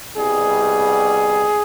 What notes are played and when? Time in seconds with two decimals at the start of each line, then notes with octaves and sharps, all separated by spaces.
0.16 C2 B2 G3 G#4